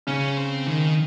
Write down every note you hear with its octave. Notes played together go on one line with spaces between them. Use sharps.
C#3 C#4
C4
D#3